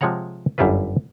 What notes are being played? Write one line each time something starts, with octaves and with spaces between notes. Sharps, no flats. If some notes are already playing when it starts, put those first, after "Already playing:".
C3 F3 G#3 C#5 F#5 A#5
G1 F#2 G3 E4 F4 B4